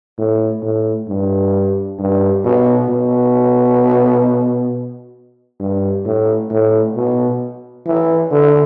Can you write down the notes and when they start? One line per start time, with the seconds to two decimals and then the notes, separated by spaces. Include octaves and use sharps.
0.18 A2
0.63 A2
1.08 G2
1.99 G2
2.44 B2
2.89 B2
5.60 G2
6.05 A2
6.51 A2
6.96 B2
7.86 E3
8.31 D3